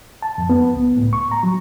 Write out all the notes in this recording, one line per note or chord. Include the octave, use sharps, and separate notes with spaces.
A5
F2
B3
C#2
A2
C#6
A#5
F#3